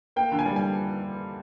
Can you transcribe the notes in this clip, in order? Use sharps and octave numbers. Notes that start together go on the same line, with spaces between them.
A#3 G5
D3
G#5
G3
G#5